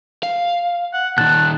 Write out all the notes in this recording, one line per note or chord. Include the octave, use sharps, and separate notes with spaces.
F5
F#5
A#2 D#3 A5 F#6